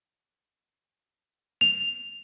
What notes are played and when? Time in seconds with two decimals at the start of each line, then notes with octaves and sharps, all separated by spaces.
1.61 F7